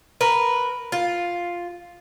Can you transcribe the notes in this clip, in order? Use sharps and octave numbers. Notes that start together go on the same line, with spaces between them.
A#4 B4
F4